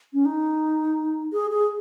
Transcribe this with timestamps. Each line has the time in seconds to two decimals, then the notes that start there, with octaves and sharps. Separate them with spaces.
0.13 C#4
0.25 D#4
1.33 G#4
1.51 G#4